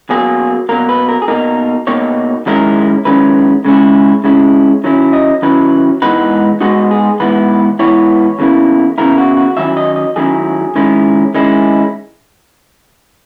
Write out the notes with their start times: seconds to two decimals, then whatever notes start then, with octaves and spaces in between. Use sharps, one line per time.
0.10 B2 F#3 A#3 G#4
0.69 B2 F#3 A#3 A#4
0.89 B4
1.09 A#4
1.22 G#4
1.28 B2 A#3 D#4 A#4
1.87 B2 A#3 D#4 C#5
2.46 F#2 D#3 G#3 C#4 E4 A#4
3.05 F#2 D#3 G#3 C#4 E4 B4
3.65 C#3 G#3 C#4 E4
4.24 C#3 G#3 C#4 E4
4.84 D#3 F#3 C#4 E4
5.13 D#5
5.42 D#3 F#3 C#4 E4 B4
6.02 G#2 E3 G#3 B3 D#4 B4
6.61 G#2 E3 G#3 B3 D#4 F#4
6.91 G#4
7.20 G#2 E3 B3 E4 B4
7.79 G#2 E3 B3 E4 C#5
8.39 E2 C#3 E3 A#3 E4
8.98 E2 C#3 E3 A#3 E4 A#4
9.18 F#4
9.37 F#4
9.57 F#2 D#3 F#3 C#4 E4 E5
9.77 D#5
9.96 D#5
10.16 F#2 D#3 F#3 C#4 E4 G#4
10.76 D#3 G#3 C#4 E4
11.35 D#3 G#3 C#4 E4